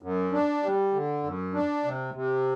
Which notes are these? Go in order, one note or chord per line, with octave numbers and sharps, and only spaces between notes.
F#2
D4
G3
D3
F#2
D4
C3
C3